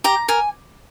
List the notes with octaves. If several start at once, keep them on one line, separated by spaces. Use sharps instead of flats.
G4 A#5
A#4 G#5